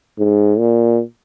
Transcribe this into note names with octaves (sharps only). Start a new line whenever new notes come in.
G#2
A#2